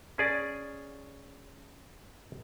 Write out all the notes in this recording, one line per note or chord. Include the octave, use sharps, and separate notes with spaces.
C#4 G#4 D5